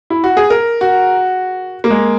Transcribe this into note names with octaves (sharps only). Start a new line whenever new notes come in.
E4
F#4
G#4
A#4
F#4
A#3
G#3